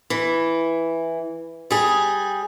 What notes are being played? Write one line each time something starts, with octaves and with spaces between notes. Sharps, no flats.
E3
G3 G#4